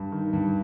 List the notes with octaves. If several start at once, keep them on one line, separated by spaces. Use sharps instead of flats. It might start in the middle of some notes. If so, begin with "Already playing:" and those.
Already playing: G2
D#3
G2